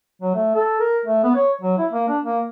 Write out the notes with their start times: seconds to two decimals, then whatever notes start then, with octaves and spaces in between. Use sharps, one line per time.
0.22 F#3
0.35 A3
0.54 A4
0.80 A#4
1.06 A3
1.23 B3
1.35 C#5
1.61 F#3
1.78 E4
1.91 A#3
2.08 D4
2.23 A#3